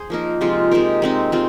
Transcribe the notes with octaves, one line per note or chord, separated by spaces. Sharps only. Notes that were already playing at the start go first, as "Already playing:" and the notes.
Already playing: G#4 C5
F3 A#3 D#4 A#4
C3 F3 G#3 F4
C3 G#3 D#4 A#4
G#3 C4 D#4
G#3 C4 F4